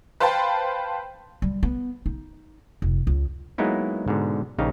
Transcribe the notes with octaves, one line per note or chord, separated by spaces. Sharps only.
B4 C5 F5 G5 A5
G3
B3
D#4
F1
C#2
F#3 G#3 A#3 B3 D#4 E4
G#2 B2 D3
A#1 C#3 D#4 G4 F5